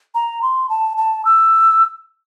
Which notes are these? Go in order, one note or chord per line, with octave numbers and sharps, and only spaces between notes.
A#5
C6
A5
A5
E6